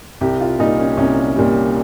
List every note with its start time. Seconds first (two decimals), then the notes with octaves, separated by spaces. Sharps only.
0.21 C2 G4
0.41 F4
0.59 A#2 G3 D#4
0.79 C#4
0.97 C2 C#4
1.36 A#2 G3